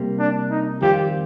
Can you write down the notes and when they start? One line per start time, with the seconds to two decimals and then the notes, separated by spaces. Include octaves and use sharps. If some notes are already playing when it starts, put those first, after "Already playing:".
Already playing: C3 G3 A#3
0.19 D4
0.51 D#4
0.82 F2 D#3 G3 C4 F4 G4